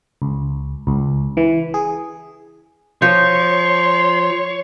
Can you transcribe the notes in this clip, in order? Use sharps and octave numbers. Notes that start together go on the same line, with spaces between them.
C#2
C#2
E3
G#4
F3 C#5 C6 G6